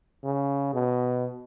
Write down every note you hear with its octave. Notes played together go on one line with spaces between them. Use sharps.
C#3
B2